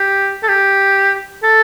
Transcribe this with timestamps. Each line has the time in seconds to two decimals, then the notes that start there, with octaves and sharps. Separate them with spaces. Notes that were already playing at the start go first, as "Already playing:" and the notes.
Already playing: G4
0.43 A4
0.48 G4
1.44 A4